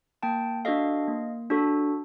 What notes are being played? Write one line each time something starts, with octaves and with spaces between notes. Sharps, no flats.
A#3 G5 A5
D4 F#4 A4 D#5 F5
A#3
D4 F#4 A4